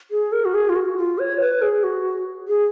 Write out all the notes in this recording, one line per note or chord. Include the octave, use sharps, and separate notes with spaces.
G#4
A#4
F#4
G#4
F4
F#4
F4
C#5
B4
G#4
F#4
G#4